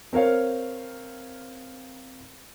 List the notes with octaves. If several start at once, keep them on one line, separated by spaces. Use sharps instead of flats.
C4 A#4 C#5 F5